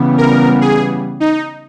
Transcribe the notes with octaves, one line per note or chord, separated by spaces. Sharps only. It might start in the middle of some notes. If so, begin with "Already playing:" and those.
Already playing: C#3 E3 G3 B3
A#4
G#4
D#4